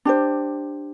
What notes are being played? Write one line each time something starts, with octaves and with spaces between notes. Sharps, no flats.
D4 G4 C5